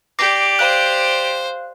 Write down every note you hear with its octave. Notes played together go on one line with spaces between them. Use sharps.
G4 D5 D6 A#6 C7
C5 F5 F#6